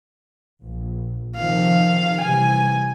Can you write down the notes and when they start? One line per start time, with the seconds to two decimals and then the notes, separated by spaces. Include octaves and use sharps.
0.64 A#1
1.36 C3 D#3 F3 F5
2.22 C3 E3 G3 G#5